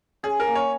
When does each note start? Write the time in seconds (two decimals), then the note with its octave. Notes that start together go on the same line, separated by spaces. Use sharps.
0.23 C#4 G#4
0.40 A#4
0.47 A#3
0.55 C#5